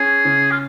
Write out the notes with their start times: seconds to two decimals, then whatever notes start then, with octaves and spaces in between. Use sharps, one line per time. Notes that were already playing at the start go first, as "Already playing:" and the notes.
Already playing: C#4 G#4
0.25 C#3
0.51 F4